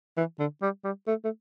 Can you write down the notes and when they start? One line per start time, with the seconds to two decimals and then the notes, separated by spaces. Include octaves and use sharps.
0.17 E3
0.39 D3
0.62 G3
0.84 G3
1.07 A3
1.24 A3